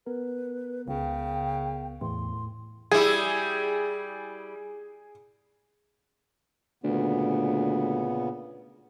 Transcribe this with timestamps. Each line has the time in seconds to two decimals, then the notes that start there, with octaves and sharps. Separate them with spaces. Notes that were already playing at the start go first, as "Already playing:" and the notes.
0.06 B3 A#4 B4
0.88 C#2 C#3 G5
2.01 E2 A2 C6
2.91 G3 E4 G#4
6.84 D2 A#2 C#3 B3